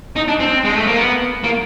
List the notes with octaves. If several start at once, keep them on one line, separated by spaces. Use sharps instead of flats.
D#4
D4
C4
G#3
A3
A#3
B3
A#3